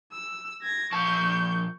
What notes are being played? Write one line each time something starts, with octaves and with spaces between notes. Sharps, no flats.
E6
G#6 A#6
A#2 F3 A5 C#6 G6